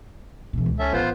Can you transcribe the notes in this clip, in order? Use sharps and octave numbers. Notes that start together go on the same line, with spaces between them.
B2 E3
C#2
C#4 A4 E5
A1 B3 F4 C5